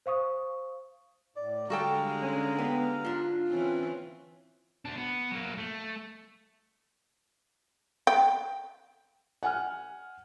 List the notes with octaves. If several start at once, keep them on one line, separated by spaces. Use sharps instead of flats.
C5 F5 C#6 D#6
A2 D5
D3 G3 G#3 F#4 A4 F5 G5 A#5
C#4
B3 G4
G#2 D4 F4
E3 C4 C#4
D2 D4
B3
F#3 A#3
A3
G5
F#5 G#5 F6